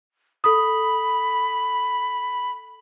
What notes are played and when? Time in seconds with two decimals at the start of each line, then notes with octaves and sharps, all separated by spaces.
0.44 A4 B5 D#6